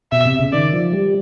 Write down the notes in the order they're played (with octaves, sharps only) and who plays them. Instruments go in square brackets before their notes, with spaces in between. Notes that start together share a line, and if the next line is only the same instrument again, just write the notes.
[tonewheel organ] B2 [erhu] E5
[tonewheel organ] C3
C#3
[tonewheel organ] D#3 [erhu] D5
[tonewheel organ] F3
G3